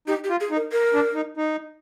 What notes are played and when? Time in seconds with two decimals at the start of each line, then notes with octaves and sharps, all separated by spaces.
0.08 D#4 G4
0.24 G4
0.30 F4
0.40 G#4
0.51 D#4
0.56 A#4
0.72 A#4
0.94 D4
1.15 D#4
1.37 D#4